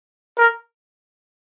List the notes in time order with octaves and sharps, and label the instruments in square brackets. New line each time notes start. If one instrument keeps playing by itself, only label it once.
[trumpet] A#4